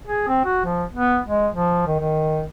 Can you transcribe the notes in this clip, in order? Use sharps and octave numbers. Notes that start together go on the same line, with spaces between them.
G#4
C4
F#4
F3
B3
G#3
F3
D#3
D#3